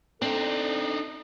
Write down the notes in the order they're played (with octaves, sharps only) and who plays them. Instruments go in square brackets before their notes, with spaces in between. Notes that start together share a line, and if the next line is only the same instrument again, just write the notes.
[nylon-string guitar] C4 [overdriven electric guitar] D4 D#4 [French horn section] A4